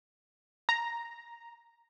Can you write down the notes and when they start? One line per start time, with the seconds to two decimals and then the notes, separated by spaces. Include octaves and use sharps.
0.69 A#5